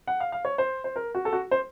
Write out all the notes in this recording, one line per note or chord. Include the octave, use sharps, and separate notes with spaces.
F#5
F5
F5
C#5
C5
C5
A#4
F#4
A4
F#4
C5